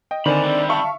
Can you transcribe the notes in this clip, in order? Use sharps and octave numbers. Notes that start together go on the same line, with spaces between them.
D#5 G5
D3 D#3 C4 D5 G#5 B5
G3 E4
E5 F5 A5 C#6